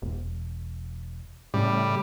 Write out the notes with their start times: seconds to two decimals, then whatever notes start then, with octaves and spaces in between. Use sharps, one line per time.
0.02 E1
1.54 A2 C#3 G3